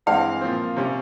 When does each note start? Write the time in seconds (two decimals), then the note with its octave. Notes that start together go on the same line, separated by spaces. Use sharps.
0.06 G2 E3 G#3 C4 F5
0.41 A#2 F3 C4
0.77 C3 G3 C#4